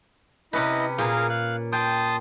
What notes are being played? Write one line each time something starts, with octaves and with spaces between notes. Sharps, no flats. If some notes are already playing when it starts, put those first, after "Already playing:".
C3 C#4 E4 B4 D#5
A#2 G#4 A#4 F5
F5 F#6
G5 A5 C6 D#6